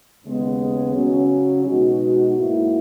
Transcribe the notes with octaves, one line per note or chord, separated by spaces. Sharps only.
D#2 C#3 G#3 B3
C#3 F#3 C#4
B2 G#3 D#4 F#4
G#2 F#3 A#3 E4